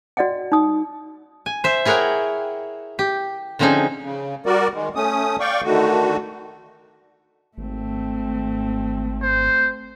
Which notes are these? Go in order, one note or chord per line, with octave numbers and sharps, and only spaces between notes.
F#4 D5 D#5 F#5 G5
D#4 D#6
G#5
C5 E5
E4 G#4 A#4 C#5 F#5 G5
G4
D3 F3 C4 C#4 D#4 G#4
C#3
G3 F#4 A#4 D5
D#3 G#3
A3 C#4 D#6
D5 F5 G5 C#6
D3 D#3 A3 F#4
G#1 A3 C4
C5